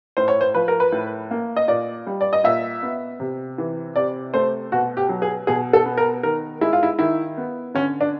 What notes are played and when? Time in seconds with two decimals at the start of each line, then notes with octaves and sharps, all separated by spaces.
0.17 A2 C5
0.28 C#5
0.41 C5
0.54 F3 B4
0.68 A#4
0.80 B4
0.92 A2
1.31 A#3
1.56 D#5
1.68 A#2 D5
2.07 G3
2.21 D5
2.33 D#5
2.44 A#2 E5
2.83 B3
3.20 C3
3.58 E3
3.96 C3 D5
4.34 A3 C5
4.72 B2 F#4
4.97 G4
5.09 F#3
5.22 G#4
5.47 B2 G#4
5.73 A4
5.86 B3
5.98 A#4
6.23 D#3 A#4
6.61 G#3 E4
6.73 F4
6.83 E4
6.99 D#3 E4
7.38 B3
7.74 D3 C#4
8.01 D4